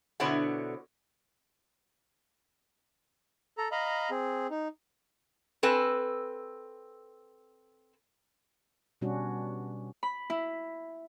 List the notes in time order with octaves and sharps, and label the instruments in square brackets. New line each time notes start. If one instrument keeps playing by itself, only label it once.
[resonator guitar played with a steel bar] B2 D3 E4 C5 C#5 F#5
[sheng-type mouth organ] A4 A#5
D#5 F5 A#5 B5
C4 G#4
D#4
[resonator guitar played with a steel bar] C4 A4 B4 G#5
[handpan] B2 G3 C#4 D4 F#4
[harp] B5
E4